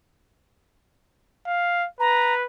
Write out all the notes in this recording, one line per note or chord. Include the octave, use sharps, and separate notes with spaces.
F5
B4 A#5